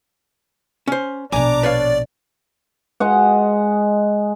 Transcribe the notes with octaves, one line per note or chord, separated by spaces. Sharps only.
C#4 C5
A#1 B2 D4 G#5 A#5 D6
B4 C#5 D5 F5
G#3 D#5 F#5